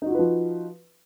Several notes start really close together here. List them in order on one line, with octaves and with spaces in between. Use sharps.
D#4 F#4 F4 B4 F3